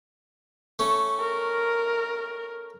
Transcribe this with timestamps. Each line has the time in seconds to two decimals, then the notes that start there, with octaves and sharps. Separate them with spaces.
0.79 A3 C#4
1.20 A#4